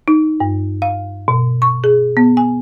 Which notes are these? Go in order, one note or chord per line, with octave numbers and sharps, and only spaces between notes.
D#4
G2
F5
B2
C#6
G#4
B3
G#5